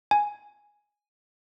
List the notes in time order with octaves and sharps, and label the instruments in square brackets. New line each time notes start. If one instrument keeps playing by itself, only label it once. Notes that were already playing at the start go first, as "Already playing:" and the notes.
[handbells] G#5